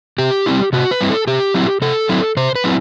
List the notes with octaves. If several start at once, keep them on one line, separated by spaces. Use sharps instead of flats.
C3 G4
G3 C4 E4
C3 F#4
B4
G3 C4 E4
A4
C3 G4
F#3 C4 E4
C3 A4
F#3 C4 E4
C3 C5
B4
F#3 C4 E4